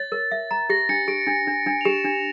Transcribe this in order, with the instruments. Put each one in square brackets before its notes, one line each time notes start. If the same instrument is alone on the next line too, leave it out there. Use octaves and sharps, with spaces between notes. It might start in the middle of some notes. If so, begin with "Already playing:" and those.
Already playing: [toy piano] C#5 [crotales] A6
[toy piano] A#4
E5
A#5
[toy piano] G4 [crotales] A#6
[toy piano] D4 [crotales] C#7
[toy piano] G4 [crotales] D7
[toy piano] D4
D4
D4
[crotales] F7
[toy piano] G4 [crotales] E7
[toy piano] D4